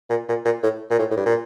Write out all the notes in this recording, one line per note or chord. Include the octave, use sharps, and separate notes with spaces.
A#2
A#2
A#2
A2
A#2
A2
A2
G2
A#2